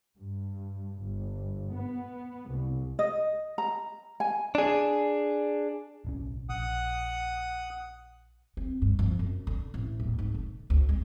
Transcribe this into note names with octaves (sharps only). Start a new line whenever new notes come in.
G2
G1
B3
C2
D#5
A#5
G#5
D4 G#4
D1 B1 C#4
A#1 F#5 D#6
C4
G2
F3
F#2
D3
A1
D#1
G#2
D3
D2
G#3